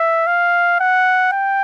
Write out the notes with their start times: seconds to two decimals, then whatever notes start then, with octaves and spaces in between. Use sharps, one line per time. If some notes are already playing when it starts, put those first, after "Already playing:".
Already playing: E5
0.27 F5
0.80 F#5
1.33 G5